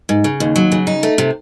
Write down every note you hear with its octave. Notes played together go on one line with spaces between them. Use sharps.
G#2
C#3
D#2
F#3
C#3
D#4
A3
C3